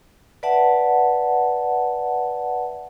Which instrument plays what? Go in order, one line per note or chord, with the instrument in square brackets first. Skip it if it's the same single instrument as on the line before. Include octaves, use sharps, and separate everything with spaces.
[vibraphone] B4 D5 E5 F#5 A5